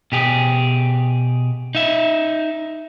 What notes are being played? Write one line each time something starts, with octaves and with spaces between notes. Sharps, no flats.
B2 G4 G#4
D#4 E5